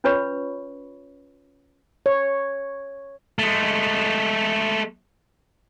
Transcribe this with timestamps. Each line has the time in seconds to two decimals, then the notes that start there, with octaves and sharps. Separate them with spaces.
0.04 C#4 F4 B4 C#5 B5 C#6
2.06 C#5
3.39 G#3 A3